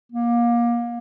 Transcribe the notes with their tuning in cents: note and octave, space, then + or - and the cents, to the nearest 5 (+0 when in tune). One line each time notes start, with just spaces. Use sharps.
A#3 +25